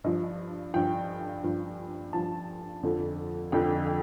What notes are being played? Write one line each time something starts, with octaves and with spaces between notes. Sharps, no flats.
G2 F3 D#5
G2 F3 G5
G2 F3
G2 F3 A5
F2 D3 F3
F2 D3 F3 G5
G5